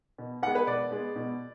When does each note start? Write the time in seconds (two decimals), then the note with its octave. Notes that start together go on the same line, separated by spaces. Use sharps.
0.18 B2
0.43 G#3 B3 F#5
0.55 B4
0.67 B2 D5
0.91 G#3 B3
1.16 B2